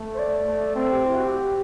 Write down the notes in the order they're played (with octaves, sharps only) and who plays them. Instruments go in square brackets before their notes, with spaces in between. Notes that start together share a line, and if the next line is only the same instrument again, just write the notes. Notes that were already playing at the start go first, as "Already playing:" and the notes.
Already playing: [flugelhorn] A3
[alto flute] C5
D5
[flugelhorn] A3
[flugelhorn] C4 [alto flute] A4
[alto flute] G4
E4
F#4
G4